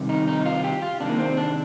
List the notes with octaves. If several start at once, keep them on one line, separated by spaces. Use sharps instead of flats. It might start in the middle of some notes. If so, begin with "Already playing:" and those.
Already playing: C3 D#3 G3
D#4
D#4
F4
G4
F4
C3 D#3 G#3 D4
A#3
C4
D4